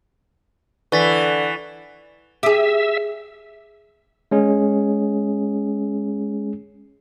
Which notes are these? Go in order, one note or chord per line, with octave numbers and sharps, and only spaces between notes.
D3 E3 B4 C#6 A6 B6
G4 G#4 E5
G#3 C#4 G#4